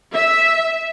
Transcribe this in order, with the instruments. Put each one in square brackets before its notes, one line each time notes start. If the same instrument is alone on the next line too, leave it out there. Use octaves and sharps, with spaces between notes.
[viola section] E5